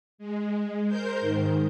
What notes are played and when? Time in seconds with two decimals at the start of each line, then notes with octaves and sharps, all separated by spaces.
0.18 G#3
0.88 A#4 C5 G6
1.20 G#2 D#3